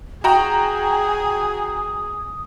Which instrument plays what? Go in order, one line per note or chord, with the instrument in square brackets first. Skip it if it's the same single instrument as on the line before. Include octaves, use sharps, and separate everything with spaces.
[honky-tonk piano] F#4 G5 A#5 [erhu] G#4 [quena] D#6